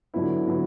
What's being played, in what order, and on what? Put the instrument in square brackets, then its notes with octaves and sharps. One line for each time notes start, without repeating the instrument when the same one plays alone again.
[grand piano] D3 F#3 B3 E4
D3 F#3 B3